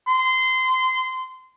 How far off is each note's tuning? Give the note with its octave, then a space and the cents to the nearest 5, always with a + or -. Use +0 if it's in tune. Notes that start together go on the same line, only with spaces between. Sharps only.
C6 -20